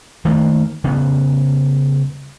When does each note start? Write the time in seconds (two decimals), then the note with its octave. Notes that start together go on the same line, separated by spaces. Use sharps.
0.25 D#3 A3 A#3
0.84 C#3 G3 B3